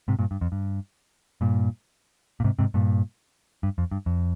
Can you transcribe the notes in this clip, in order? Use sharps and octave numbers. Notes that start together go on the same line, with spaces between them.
G#2 C3
G2 A#2
G2
F2
G2
G2 A#2
A#2
G#2 C3
G#2 C3
G2 A#2
G2
F2
G2
F2